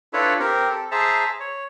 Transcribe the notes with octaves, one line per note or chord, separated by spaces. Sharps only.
D4 E4 F4 A4 B4 C#5
C4 G4 A#4
A4
G#4 C5 E5 A5 A#5
C#5